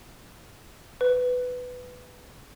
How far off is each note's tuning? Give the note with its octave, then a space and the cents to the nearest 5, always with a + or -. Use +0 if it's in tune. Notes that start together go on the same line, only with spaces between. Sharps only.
B4 +10